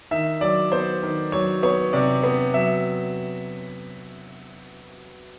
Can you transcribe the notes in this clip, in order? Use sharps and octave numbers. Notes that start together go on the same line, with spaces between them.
D#3 E5
F#3 D5
B3 C5
D#3
F#3 C#5
B3 C#5
C3 D5
B3
F#3 E5